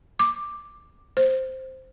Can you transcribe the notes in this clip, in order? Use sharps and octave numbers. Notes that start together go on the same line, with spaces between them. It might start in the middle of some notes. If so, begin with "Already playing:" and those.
D6
C5